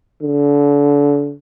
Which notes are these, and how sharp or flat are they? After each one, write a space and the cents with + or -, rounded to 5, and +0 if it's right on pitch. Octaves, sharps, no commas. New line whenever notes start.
D3 -30